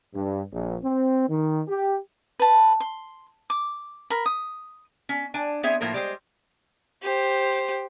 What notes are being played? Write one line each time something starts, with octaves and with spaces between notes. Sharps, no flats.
G2
A#1
C4
D#3
G4
B4 A5
C6
D6
A#4 B5
D#6
C#4
D4 G#5
B3 C4 G#4 C#5 E5
A2 F3 A#3 E4 A#4
G3 G#3 C5
G4 C5